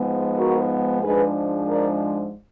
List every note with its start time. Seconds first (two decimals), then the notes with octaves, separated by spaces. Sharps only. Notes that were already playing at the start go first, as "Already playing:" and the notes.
Already playing: G#2 F3 G#3 B3
0.36 F#4 A#4
1.02 G#2 F3 G#3 D4 G#4 B4
1.68 A#4 D5